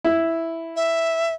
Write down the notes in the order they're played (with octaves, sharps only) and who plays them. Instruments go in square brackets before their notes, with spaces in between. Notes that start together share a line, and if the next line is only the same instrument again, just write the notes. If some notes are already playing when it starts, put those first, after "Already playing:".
[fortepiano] E4
[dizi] E5